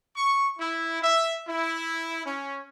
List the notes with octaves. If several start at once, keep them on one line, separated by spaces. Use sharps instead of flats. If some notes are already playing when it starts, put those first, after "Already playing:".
C#6
E4
E5
E4
C#4